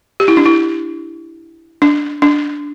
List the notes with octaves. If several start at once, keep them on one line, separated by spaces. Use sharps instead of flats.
G4
E4
D4
E4
D4
D4